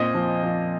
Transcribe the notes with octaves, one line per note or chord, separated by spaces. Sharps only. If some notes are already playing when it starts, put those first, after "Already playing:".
Already playing: A#2 C4 D#5
F3
F3